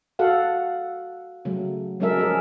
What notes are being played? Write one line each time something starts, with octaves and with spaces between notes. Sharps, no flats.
F#4 A4 F5 F#5
C#3 F#3 A3
F#3 G#3 C#4 A4 A#4 E5
F3 C#4 G#4 A#4